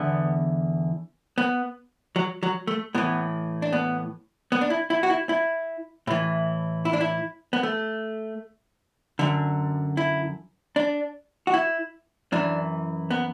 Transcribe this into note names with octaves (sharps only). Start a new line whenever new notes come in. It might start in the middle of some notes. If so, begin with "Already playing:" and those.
Already playing: E2 D3 B3
B3
F#3
F#3
A3
A2 E3 B3
D4
B3
B3
D4
E4
E4
F#4
E4
E4
A2 E3
E4
D4
E4
B3
A3
F#2 D3
E4
D4
F#4
E4
F#2 E3 D4
B3